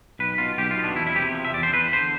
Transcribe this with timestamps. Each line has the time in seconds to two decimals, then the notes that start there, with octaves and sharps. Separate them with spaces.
0.19 B1 B4
0.38 B2 F4
0.58 B1 G4
0.71 F4
0.77 B2
0.84 D4
0.96 E2 E4
1.07 E4
1.15 C3 G4
1.34 F3
1.45 E5
1.54 E2 D5
1.63 C5
1.73 E2 B4
1.93 D3 C5